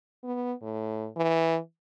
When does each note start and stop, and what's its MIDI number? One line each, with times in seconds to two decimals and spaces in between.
0.24 0.53 59
0.62 1.08 45
1.16 1.58 52